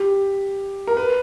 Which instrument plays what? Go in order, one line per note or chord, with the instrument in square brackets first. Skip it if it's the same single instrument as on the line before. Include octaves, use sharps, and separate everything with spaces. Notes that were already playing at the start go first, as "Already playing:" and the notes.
Already playing: [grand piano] G4
A#4
B4